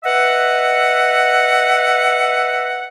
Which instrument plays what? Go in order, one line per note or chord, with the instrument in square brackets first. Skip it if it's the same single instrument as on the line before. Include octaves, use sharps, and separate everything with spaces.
[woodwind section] B4 D#5 E5 F#5